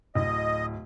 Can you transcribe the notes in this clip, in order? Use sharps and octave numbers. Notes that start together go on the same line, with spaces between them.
D1 D#5